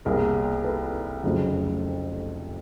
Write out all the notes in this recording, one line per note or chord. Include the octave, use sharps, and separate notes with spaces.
C2 B2 G3 A#3 G#4 A#4
A4 B4
F1 F2 C#3 F#3 A3